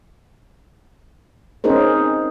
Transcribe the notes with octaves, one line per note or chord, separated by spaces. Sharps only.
C4 C#4 D#4 G#4 A#4 C5